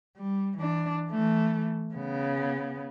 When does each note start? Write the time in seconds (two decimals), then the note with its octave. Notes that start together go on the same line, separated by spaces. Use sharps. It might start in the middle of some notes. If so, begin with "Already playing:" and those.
0.17 G3
0.58 E3 D4
1.11 E3 A3
1.95 C#3 B3